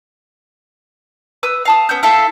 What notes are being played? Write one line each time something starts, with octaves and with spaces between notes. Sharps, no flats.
B4 D#6 E6
F5 A5 D#6
B3 C#4 E6 G6
E4 A4 E5 F5